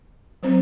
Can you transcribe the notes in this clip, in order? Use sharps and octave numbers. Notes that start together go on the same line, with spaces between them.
F#3 C4 C5